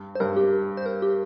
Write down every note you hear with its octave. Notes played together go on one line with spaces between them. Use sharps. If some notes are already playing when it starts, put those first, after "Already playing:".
Already playing: G2
C5
G2 A#4
G4
C5
A#4
G4